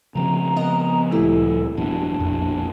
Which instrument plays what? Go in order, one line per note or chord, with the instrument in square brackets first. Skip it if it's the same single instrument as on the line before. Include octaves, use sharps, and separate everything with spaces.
[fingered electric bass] C#3 F3 C4 [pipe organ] A#5
[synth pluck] B3 A#4 D#5
[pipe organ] D2 A#2 A4 [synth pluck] G3 A3 E4
[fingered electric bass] G1 F2 B2 [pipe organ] D4
[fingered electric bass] E1 A#1 B2 [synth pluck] F2